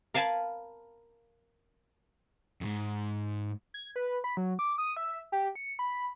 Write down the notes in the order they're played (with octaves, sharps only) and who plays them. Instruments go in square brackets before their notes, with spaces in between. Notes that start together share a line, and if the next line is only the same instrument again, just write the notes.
[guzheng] A#4 F5 G#5 A5 B5
[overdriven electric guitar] F2 G#2
[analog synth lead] G#6
B4
B5
F#3
D6
D#6
E5
G4
C#7
B5